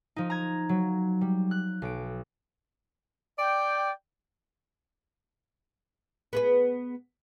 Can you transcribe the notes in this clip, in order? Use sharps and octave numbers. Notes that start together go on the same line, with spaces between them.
F3 D#4
A#5 G#6
F#3
G3
F#6
B1 D7
D5 G5
B3 G#4 B4